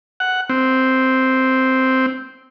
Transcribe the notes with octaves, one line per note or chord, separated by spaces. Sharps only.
F#5
C4